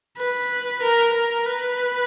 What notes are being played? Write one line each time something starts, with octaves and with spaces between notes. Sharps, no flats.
B4
A#4
A#4
B4